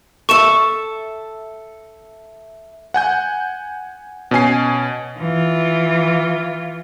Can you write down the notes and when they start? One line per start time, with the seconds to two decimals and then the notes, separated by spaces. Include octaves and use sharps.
0.29 A4 E5 C#6 E7
2.94 F#5 G#5 G6
4.31 B2 C#4 G#5 C7
5.18 E3 F4